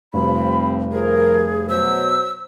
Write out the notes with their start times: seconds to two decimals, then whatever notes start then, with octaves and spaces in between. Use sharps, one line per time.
0.14 F1 F3 G3 C4 B5
0.92 F3 G#4 A#4
1.69 B2 F#3 C5 E6